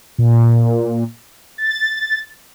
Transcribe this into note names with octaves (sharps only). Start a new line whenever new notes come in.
A#2
A6